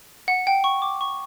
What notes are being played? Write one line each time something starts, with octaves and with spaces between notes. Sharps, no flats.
F#5
G5
C#6
D6
C#6